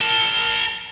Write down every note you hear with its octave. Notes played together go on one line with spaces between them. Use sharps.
A#4 A5